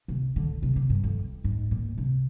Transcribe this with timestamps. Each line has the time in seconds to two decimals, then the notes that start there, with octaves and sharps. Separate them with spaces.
0.08 C3
0.36 D3
0.63 C3
0.76 C3
0.90 G2
1.03 F2
1.44 G#2
1.71 A#2
1.98 C3